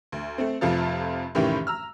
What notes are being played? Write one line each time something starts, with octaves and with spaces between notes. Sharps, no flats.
D2
A3 C4
F1 F2 C3 F3 F4 A4
F1 A2 D#3 E3 C#4 G4
A#5 E6 F6